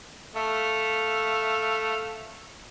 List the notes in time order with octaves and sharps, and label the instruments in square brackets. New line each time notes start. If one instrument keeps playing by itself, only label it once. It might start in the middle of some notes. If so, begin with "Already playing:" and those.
[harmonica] A3 E5 F5